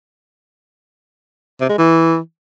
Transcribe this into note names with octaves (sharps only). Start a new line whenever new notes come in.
C3
G#3
E3